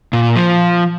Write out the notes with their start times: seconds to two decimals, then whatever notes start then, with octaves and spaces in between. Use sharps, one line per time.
0.13 A#2
0.36 F3